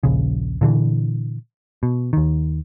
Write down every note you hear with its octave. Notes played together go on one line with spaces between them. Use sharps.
D#1 A#1 C#3
A#2 D3 E3
B2
D#2 D#3